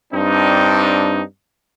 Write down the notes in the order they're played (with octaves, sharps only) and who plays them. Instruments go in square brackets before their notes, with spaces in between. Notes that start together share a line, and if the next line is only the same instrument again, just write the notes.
[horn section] G2 C4 D4 D#4